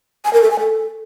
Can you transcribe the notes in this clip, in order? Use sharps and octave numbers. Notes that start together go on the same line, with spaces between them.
G#5
A#4
A4
G#5
A4